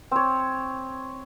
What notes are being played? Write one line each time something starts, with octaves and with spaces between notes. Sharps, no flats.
C4 C#5